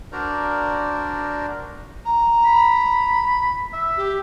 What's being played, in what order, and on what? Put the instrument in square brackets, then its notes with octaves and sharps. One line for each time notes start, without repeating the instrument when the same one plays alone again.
[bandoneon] D4 F#4 A#4 C5 D5 A#5
[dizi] A#5
[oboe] B5
E5
[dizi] G4